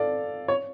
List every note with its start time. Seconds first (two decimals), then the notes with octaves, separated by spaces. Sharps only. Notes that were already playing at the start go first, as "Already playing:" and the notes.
Already playing: A4 D5 F5
0.48 C#5